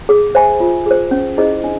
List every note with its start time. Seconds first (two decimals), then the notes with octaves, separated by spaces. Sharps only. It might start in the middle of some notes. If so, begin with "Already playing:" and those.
0.09 G#4
0.35 C5 E5 G#5 B5
0.60 F4
0.86 G#4 C5
1.11 C#4
1.38 E4 G#4 C5 D#5
1.64 D4